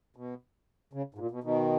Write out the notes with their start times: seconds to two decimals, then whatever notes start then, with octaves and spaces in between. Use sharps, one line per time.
0.16 B2
0.93 C#3
1.14 G#2
1.18 A#2
1.31 B2
1.44 B2 D#3